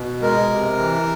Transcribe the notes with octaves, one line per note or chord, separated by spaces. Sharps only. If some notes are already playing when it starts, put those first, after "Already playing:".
Already playing: B2
G#3 A#4
C3
E3